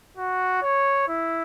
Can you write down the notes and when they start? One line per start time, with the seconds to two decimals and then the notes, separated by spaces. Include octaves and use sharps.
0.17 F#4
0.62 C#5
1.08 E4